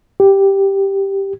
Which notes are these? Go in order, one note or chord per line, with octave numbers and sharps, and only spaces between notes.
G4